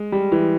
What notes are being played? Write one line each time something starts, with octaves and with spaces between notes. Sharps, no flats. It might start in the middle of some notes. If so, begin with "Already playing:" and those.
Already playing: G#3
G3
E3